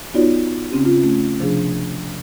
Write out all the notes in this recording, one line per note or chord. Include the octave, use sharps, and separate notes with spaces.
B3 D#4 F4 F#4 C#5 D5
C#3 C4 C#4 G4
F4
A3 C#4
C3 F3 D4 G#4